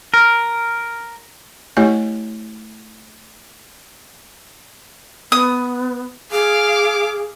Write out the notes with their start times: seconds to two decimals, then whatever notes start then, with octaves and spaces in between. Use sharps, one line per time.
0.14 A#4
1.77 A3 E4 G4 C#5 D#5 G#5
5.32 B3 D#6
6.32 G#4 F5 D6